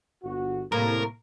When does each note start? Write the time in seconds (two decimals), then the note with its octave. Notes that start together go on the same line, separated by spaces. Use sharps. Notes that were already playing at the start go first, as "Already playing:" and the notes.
0.24 G1 F#4
0.72 C2 A2 A#3 A#4